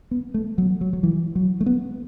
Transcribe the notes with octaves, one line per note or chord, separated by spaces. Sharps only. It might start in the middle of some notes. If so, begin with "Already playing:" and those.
B3
A3
F#3
F#3
F#3
E3
F#3
A3
B3